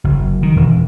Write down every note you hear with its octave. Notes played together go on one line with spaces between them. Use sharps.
F#1
D#3
E1